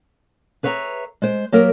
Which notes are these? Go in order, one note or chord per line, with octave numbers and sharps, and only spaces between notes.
G#4 B4 C#5 E5 F5 A#5
G#3 C5
F#3 A#3 G4 A#4